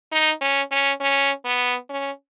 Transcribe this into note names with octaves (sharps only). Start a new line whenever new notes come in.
D#4
C#4
C#4
C#4
B3
C#4